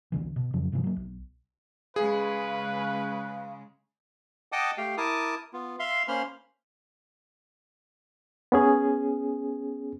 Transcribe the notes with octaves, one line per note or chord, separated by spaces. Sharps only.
C2 D3 E3
B2
F2 C#3 F3 F#3
G#2 C3 E3 F3
F#3 A#3
B1
C#3 G#3 G#4 B4 F5
D#5 F#5 G5 A5 D6 D#6
A3 G4 F5 G5
E4 A#4 A5 D6 D#6
B3 F4
E5 F5 C6
A#3 C#4 C5 B5 C6 F6
B3 C#4 G#4